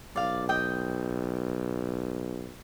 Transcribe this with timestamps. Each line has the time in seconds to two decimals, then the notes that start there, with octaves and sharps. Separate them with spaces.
0.16 B1 D5 F5
0.49 D#5 G5